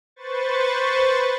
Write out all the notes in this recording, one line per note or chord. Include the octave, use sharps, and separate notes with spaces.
B4 C5 C#6 A6